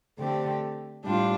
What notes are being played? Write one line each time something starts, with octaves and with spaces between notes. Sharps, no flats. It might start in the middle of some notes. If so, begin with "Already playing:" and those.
D3 A3 C4 G4
A2 G3 D4 F4